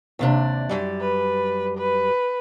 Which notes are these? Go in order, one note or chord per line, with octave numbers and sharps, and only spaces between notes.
D#2 C3 D4
F#2 G3
B4
B4